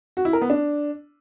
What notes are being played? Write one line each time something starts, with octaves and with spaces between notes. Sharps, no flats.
F#4
E4
A#4
B3
D4